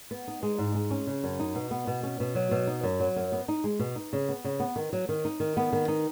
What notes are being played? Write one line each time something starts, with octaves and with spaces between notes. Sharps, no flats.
B3
D#4
G#3
G#2
G#3
C#4
C#3
F#2
D#4
B2
B3
B2
C#4
B2
F#3
B2
D#4
F#2
F#3
F#2
B3
D#4
G#3
B2
D#4
C#3
B3
C#3
B3
D#3
F#3
D#3
D#4
D#3
B3
D#3
D#4